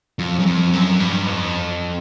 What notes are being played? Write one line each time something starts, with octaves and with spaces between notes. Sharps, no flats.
F2
F#2
F2
F#2
G2
F2